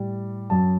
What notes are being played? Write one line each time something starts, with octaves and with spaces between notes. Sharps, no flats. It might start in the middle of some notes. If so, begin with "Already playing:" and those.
Already playing: A2 G3
F#2 F#3 A5